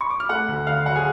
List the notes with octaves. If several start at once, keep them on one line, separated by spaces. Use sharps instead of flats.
C#6
D6
F6
A3 F#5 F#6
D2
D3 F5 F6
F#3 F#4 F#5
G#4 G#5